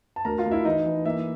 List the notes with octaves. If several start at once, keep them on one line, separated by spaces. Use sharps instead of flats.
A5
D2 A#4 A#5
F4 F5
D2
E4 E5
E3 D#4 D#5
E3
A#3 E4 E5